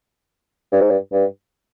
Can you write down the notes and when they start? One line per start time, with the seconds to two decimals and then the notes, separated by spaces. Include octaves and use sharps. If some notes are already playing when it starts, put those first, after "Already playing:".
0.73 G2
0.81 G#2
0.90 G2
1.13 G2